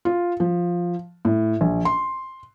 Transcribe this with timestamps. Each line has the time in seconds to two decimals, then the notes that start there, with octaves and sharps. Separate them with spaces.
0.05 F4
0.40 F3
1.25 A2
1.61 A#1
1.85 C6